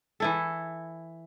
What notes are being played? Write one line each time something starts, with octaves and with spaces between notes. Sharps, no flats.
E3 E4 A4